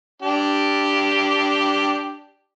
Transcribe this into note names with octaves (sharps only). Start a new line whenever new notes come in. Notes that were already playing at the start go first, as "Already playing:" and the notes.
D4 G4